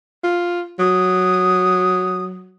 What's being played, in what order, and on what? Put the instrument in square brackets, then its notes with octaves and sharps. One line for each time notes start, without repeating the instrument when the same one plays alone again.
[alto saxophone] F4
[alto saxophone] F#3 [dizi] D#6